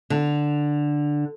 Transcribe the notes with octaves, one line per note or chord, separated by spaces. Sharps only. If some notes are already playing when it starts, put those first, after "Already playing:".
D3